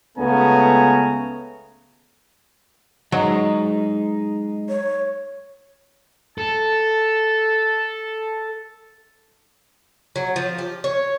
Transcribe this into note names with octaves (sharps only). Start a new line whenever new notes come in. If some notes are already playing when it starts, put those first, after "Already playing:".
C#2 C#3 A3 B3 G#5 A#5
F#3 G#3 D#4
C#5
A4 A5
F#3
F3
G4
C#5